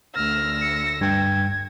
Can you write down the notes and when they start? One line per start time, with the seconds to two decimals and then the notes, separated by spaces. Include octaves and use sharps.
0.15 D2 E6 F6 A#6
0.61 C#7
1.01 G2 G5 G#6